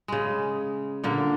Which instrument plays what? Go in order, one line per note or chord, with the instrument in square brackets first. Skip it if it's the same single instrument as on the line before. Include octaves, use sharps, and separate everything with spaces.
[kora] C#3 G#3
A#2 D3 A#3